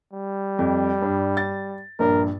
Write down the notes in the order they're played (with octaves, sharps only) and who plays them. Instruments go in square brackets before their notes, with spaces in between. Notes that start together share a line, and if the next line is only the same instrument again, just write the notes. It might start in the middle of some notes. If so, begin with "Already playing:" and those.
[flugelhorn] G3
[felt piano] F2
G2
A6
[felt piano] A#1 G2 [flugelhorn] A#4